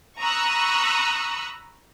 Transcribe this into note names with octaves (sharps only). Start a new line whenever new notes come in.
A#5 B5 C#6 D#6 E6 F#6